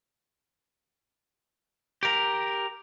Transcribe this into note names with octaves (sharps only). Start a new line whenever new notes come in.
G4 A#4